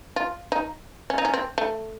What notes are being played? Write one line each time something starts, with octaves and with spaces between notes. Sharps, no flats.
F4
D#4
C#4
D#4
C#4
C4
A3